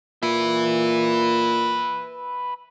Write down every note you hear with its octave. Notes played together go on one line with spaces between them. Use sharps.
A#2 B4 E5